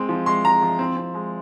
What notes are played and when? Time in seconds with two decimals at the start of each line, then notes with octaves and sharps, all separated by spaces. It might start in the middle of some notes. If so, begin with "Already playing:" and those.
Already playing: G#3 C4
0.09 F3
0.26 G#3 C6
0.44 G#3 A#5
0.62 F3
0.79 C4
0.97 C4
1.14 G#3